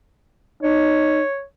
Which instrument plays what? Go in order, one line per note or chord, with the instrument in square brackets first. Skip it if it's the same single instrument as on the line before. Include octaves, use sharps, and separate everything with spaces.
[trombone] D#4 [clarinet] C#5